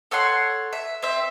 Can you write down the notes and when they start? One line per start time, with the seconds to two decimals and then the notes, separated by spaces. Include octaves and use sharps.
0.11 A4 C#5 F#5 C6
0.73 E5
1.03 C4 E5